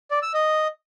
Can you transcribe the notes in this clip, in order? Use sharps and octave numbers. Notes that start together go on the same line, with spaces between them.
D5
E6
D#5